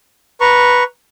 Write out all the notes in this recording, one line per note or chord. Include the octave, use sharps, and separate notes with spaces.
B4 A#5 C#6